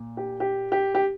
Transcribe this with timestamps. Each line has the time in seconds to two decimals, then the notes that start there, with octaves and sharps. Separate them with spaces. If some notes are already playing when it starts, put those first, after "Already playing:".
Already playing: A#2
0.17 G4
0.40 G4
0.72 G4
0.95 G4